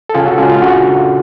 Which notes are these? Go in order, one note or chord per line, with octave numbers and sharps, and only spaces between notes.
A4
C#3 F4 G#4
F#4 A4
G#3 C#4 F4 G#4
F4
C#3 D4 F#4